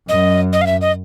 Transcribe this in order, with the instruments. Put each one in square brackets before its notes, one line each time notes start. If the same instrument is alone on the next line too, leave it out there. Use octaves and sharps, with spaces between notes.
[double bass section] F#2 [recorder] D#5
[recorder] D#5
F5
E5
D#5